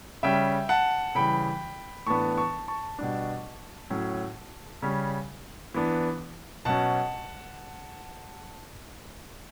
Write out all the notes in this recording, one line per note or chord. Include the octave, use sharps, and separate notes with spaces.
C#3 G3 C#4 E5 G5
F#5 A5
C#3 E3 G3 G5 B5
A2 E3 B3 D4 A5 C#6
A5 C#6
A5 C#6
B2 G3 D4
A2 F#3 C#4
C#3 G3 C#4
E3 B3 D4
B2 F#3 C#4 F#5 A5